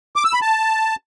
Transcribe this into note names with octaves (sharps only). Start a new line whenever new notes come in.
D6
E6
B5
A5